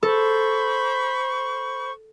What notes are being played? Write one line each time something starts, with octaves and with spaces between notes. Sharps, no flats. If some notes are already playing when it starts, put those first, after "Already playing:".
A4 C5 B5 C#6